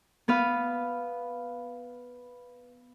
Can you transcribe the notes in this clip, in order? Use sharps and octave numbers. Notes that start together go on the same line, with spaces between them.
B3 B4 F5